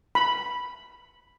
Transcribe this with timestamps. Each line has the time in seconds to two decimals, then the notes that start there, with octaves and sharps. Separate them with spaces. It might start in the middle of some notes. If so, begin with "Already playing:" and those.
0.15 B5